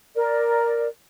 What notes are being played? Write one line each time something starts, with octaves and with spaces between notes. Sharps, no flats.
A#4 D5